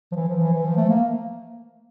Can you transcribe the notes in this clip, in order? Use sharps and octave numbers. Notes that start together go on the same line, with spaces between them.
F3
E3
F3
E3
E3
F3
A3
A#3